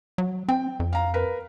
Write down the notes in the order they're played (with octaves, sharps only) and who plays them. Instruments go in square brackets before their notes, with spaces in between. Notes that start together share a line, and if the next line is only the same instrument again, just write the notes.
[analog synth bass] F#3
[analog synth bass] C4 [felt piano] G5
[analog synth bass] F2
[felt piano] F5 A#5
A#4 B4